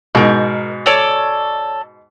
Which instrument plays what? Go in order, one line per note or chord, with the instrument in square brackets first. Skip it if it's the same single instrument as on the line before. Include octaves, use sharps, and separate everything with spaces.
[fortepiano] G#2 B2 [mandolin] A#4 G6
[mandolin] A4 C#5 D5